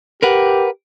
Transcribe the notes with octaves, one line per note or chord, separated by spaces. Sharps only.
G4 A#4 B4 F#5